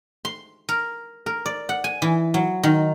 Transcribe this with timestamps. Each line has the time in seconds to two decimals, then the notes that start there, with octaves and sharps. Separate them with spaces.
0.25 C6
0.69 A#4
1.26 A#4
1.46 D5
1.69 F#5
1.84 G#5
2.02 E3
2.34 F#3
2.63 D#3